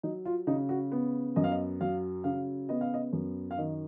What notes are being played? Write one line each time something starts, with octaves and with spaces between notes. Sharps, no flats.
F#3 D#4
F4
C#3 D#4
F#4
B3
F#2 D#5
F5
D#5
F#3 F5
C#3 F5
B3 D#5
F5
D#5
F#2
F5
D#3 D#5